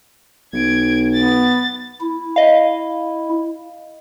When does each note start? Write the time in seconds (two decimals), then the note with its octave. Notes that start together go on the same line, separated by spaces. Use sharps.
0.53 B1 G#6 D7
1.14 B3 A6
2.01 E4
2.36 D#5 F5